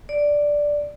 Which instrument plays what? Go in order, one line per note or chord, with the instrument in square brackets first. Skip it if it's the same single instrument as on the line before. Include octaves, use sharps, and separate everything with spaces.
[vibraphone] D5